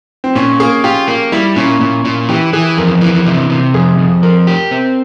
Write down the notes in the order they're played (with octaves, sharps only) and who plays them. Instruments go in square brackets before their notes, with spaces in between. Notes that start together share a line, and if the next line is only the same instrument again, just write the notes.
[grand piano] C4
[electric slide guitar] A#2 [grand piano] C#4
[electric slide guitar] A#3 [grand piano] G#4
[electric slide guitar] F4 [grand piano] G4
[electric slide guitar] A#3
[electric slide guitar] G3 [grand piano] E4
[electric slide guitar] A#2 [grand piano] C#4
[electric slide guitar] A#2
A#2
[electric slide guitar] E3 [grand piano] G4
[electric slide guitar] E3 [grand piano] G#4
[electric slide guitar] F2 [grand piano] A#4
[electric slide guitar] E3
C3
C3
[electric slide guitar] F2 [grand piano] G#4
[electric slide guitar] F2
[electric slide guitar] F3 [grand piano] A#4
[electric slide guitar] G4
C4